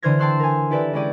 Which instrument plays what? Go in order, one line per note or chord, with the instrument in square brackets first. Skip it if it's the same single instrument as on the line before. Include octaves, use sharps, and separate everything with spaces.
[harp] D3 E3 C5 F6 G#6 A#6
G5 A5 C6 E6 F#6
A#4 G#5
E4 G4 A4 B4 D5 E5
G#3 C#4 E4 G#4 D5 G5